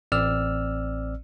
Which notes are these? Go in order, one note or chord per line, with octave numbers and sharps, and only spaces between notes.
A1 C4 D5 E6 F6